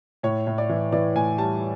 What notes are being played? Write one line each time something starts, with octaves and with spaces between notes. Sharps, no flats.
A2 C#5
A2
D5
E3
E3 D5
A2 G#5
G3 A5